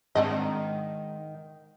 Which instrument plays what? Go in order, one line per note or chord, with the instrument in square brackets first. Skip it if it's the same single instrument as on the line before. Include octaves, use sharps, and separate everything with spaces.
[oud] G#2 [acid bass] D#3 [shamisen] C4 D4 D#5